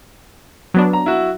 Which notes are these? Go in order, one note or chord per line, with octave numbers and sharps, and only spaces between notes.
F#3 B3 D4
A#5
E4 F#4